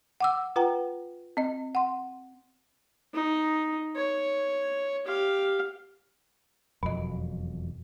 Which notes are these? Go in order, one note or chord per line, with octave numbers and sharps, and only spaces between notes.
F#5 D6 E6
F4 B4 F#5 G5 A#5
C4 D#5
F#5 C6
D#4
C#5
G4 F5
E1 F2 B2 F#3 D#5